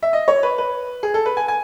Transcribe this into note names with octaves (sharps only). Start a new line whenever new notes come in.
E5
D#5
C#5
B4
B4
G#4
A4
B4
G#5
G#5